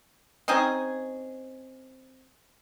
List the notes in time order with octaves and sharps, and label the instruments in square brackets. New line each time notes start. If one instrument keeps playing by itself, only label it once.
[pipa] C4 C#4 D#4 G#4